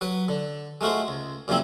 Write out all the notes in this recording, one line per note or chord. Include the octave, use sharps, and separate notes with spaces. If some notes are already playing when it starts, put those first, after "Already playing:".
F#3 B4
D3
G#3 A3 F4 F#4 C5
C#2
F#2 A#2 C#3 F3 C4 E4